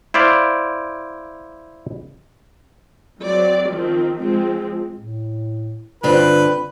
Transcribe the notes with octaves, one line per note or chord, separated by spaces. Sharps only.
E4 C5 D5 F5
F#3 C4 D5
D#3 F3 C4
F3 G#3 C4
A2
G2 D3 C4 F4 B4